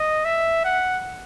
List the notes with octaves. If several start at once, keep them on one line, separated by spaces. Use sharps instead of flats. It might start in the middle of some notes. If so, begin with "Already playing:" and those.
Already playing: D#5
E5
F#5